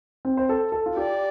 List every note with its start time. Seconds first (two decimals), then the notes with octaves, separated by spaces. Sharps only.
0.25 C4
0.37 C5
0.49 A4
0.72 A4
0.86 F4
0.96 G4 D5